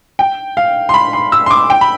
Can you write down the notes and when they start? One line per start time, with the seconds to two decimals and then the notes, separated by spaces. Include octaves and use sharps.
0.19 G5
0.57 F5
0.89 C6
0.94 B5
1.13 C6
1.32 E6
1.46 C6
1.51 D6
1.70 G5
1.81 B5